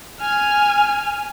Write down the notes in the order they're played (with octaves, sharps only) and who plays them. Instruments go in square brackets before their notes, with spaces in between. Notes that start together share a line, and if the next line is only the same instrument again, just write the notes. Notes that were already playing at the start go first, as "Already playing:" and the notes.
[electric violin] G#5 F6